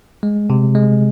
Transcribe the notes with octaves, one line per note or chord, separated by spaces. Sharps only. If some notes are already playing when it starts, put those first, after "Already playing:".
G#3
C3
G#3